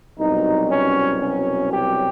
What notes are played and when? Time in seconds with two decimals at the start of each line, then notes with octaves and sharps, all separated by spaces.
0.18 C2 B2 F#3 D#4
0.70 C#4
1.21 C#4
1.72 G4